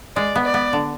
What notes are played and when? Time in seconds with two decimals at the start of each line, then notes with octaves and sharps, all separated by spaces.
0.16 G#3 D5
0.36 B3
0.44 D5
0.54 B3
0.73 D3